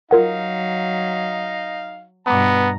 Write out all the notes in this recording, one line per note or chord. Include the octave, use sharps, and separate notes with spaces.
F#3 D#4 F4 A#4 F5 F#5
G2 B2 B3 A#5 B5 D6